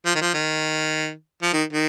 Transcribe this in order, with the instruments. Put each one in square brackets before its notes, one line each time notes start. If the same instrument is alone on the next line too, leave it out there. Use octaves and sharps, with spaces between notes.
[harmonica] F3
D#3
F3
D#3
F3
D#3
D#3